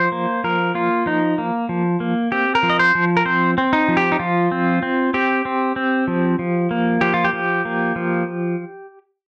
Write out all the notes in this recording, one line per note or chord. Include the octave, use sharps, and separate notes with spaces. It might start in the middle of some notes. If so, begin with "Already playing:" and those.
Already playing: F3 C5
A#3
F3 A#4
A#3 F4
F3 D#4
A#3
F3
A#3
C4 G4
A#4
F3
D#5
C5
F3
A#4
C4 C5
C4
D#4
F3
G4
D#4
F3 F4
C4
C4
C4 G4
C4
C4
F3
F3
A#3
F3 G4
F4
G4
F3
A#3
F3